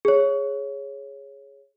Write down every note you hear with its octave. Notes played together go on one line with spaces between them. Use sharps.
G#4 C#5